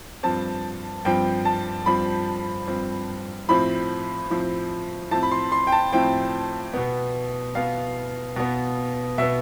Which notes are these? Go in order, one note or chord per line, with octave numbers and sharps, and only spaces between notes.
G2 F3 C4 A5
G2 F3 C4 G5
A5
G2 F3 C4 B5
G2 F3 C4
A2 F3 C4 B5
A2 F3 C4
A2 F3 C4 A5
B5
C6
C6
G5
A5
A2 F3 C4 G5
B2 B3
B2 B3 F5
B2 B3
B2 B3 E5